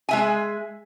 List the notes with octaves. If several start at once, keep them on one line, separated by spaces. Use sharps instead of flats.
G#3 E5 G#5